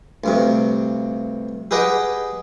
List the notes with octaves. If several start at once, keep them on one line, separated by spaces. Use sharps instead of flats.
D2 G2 C3
G4 G#4 B4 D#5 F#5 G5